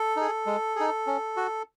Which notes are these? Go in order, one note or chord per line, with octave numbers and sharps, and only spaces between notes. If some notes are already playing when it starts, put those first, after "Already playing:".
Already playing: A4
D#4 G#4
G#3
D#4 G#4
C#4
F#4